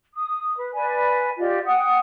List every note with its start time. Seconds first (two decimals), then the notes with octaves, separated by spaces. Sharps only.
0.13 D#6
0.57 B4
0.74 B4 D5 G#5
1.38 F4 G4 D5 D#5
1.65 F#5 G5 D#6